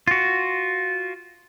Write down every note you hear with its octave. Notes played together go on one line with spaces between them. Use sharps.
F4 F#4